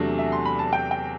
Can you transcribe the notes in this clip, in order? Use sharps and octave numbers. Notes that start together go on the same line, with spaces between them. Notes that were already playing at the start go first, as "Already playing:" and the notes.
Already playing: E2 C3 F#3 A3 D4
E5
C6
B5
A5
G5
G5